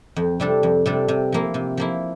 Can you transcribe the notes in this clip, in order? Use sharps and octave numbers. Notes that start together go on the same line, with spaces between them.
F2
C3 G3 D4 A4
F2
C3 G3 D4 A4
C3
F3 A#3 E4
C3
F3 A#3 E4